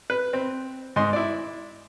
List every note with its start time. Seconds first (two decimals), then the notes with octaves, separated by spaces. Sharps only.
0.10 B4
0.33 C4
0.96 G#2 D#5 C6
1.13 E4 D5